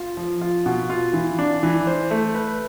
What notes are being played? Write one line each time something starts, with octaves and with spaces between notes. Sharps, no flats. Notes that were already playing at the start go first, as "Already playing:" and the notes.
Already playing: F4
F3
F4
B2
F4
E3
D4
E3
C5
A3
B4